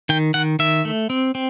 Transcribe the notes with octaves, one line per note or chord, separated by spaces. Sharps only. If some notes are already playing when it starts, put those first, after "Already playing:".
D#3 G5
D#3 F#5
D#3 E5
A3
C4
C4